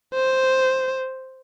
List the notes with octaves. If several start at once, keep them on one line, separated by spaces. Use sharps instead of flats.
C5